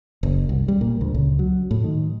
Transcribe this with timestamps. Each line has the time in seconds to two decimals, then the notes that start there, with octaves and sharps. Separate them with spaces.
0.23 F#1
0.49 C2
0.68 G3
0.81 A#2
1.01 D2
1.14 C#2
1.39 F#3
1.71 A2
1.83 D#3